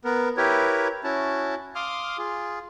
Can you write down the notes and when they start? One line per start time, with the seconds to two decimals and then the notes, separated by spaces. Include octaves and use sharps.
0.05 B3 A#4
0.37 E4 G4 A#4 B4 C#5
1.04 C#4 E4 F#4 A5
1.75 F5 C6 D6 D#6 F6
2.18 F4 G#4